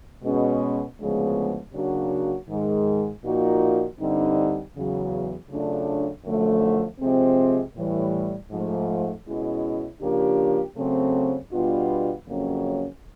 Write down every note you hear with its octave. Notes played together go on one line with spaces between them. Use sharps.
B2 G#3 C#4
D2 C#3 F3 G#3 B3
C#3 F#3 A#3 D4 F#4
G#2 D#3 G#3
A#2 F3 A#3 D#4 F#4
G2 D3 G3 C4 D#4
E2 C#3 F#3
C#3 F#3 A3 D4 F4
F#2 D3 F3 A3
C3 F3 G#3 C4
A2 E3 G3
G#2 F3 A3
B2 G#3 C#4 E4
C#3 F3 A#3 D4 G4
C#3 F#3 A3 C4
B2 G3 B3 D4 F4
F2 C#3 F#3 A#3 C#4